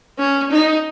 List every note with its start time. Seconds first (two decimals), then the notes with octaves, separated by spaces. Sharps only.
0.18 C#4
0.51 D#4